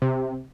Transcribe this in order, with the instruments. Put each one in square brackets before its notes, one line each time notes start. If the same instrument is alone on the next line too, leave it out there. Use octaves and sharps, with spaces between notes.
[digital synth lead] C3